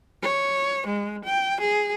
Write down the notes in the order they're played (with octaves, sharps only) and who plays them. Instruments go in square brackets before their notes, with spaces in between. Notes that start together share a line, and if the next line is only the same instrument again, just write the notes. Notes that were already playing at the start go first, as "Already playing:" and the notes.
[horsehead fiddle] C#5
G#3
G5
G#4